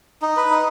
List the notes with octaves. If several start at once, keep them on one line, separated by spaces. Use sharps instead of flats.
D#4
B4
D#4